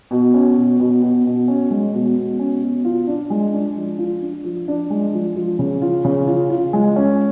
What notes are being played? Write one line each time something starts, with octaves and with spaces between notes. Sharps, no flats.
B2
C#4
B2
B2
B2
B2
C#4
G#3
B2
B2
C#4
B2
F4
D4
G#3
D4
F3
F4
D4
F3
D4
G#3
F3
F3
C#3
F4
C#3
F4
F4
G#3
C#4